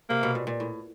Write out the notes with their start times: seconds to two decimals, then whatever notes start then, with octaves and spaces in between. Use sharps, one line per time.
0.09 C3 A#3
0.23 B2
0.35 A#2
0.47 A#2
0.60 A2